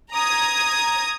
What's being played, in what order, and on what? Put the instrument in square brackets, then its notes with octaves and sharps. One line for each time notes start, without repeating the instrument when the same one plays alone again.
[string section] A#5 D#6 G#6